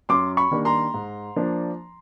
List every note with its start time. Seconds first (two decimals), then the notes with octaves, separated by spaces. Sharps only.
0.09 F#2 C6 D6
0.37 B5 C#6
0.51 D#3 G3 A#3 D4
0.65 A#5 C6
0.94 G#2
1.36 F3 A#3 D4